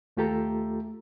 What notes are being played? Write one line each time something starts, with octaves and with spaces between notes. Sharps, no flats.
D#2 A3 F4 G4 A4 A#5